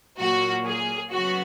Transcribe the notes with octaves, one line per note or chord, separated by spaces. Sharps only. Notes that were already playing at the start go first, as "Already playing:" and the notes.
A#2 F#3 A#3 F#4
G#4
C#3 F#3 B3 F#4